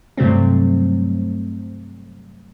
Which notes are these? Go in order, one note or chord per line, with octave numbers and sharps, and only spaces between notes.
G2 C3 F#3 A3 C4